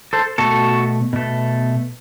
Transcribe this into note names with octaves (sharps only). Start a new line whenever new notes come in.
A4 C5
B2 A3 F#4 A4
B2 A3